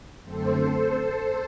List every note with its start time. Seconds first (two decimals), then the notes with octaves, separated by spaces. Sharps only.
0.23 F#2 D3 A3 C4 A4 C5